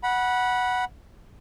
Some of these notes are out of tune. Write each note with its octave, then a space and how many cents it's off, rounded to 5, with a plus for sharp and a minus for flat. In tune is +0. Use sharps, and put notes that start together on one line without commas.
F#5 +0 B5 -20